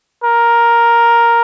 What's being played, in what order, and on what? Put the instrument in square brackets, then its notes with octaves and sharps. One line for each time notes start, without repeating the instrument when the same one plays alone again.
[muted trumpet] A#4